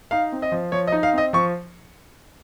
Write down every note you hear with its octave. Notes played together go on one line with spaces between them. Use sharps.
D#4 F5
C4
D#5
F3
F3 C#5
D#5
D#4
F5
C4 D#5
F3 C#6